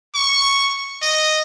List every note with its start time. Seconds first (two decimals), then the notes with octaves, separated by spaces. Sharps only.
0.15 C#6
1.02 D#5